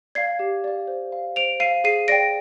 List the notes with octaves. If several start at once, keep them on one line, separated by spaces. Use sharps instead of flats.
D5 F5 G#6 C7
G4
D5 F5
C5
F5
C5 D7 F7
F5 C7 D#7
G#4 C7 D#7
D5 G5 A#6 D7